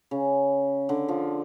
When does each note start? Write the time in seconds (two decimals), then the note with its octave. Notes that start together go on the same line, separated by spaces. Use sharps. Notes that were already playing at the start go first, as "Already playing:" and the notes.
0.11 C#3
0.89 D3
1.08 F3